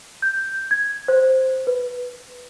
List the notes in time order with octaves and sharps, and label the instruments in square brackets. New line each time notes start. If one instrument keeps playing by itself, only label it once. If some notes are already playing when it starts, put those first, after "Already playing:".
[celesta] G6
G#6
C5
B4